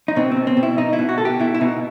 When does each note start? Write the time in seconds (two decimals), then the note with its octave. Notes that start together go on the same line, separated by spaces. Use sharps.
0.08 D#4
0.16 B2 C4
0.31 C4
0.37 B2
0.47 C4
0.57 B2
0.63 E4
0.78 B2 D#4
0.93 E4
0.99 B2
1.09 F#4
1.18 B2 A4
1.25 G4
1.39 B2 E4
1.54 E4
1.61 B2 D#4